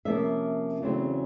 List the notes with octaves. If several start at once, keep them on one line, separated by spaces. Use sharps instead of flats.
C3 F3 A#3 C#4 E5
E2 C#3 F#3 A3 C4